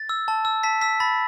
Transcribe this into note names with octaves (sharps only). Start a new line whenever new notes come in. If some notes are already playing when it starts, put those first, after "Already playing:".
Already playing: A6
E6
A5
E6
A5 B6
E6 B6
B5 A6